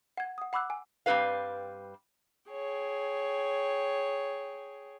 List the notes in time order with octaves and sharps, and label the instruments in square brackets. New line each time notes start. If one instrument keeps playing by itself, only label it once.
[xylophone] F#5 G#6
F#5 D#6
F#5 B5 D6 E6 F#6
G#5
[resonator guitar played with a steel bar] G2 G3 C4 F4 B4 F5
[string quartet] G#4 C#5 G5